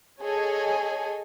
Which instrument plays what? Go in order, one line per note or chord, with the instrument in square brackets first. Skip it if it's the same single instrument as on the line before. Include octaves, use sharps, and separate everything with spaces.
[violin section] G#4 A4 C#5 D#5 G#5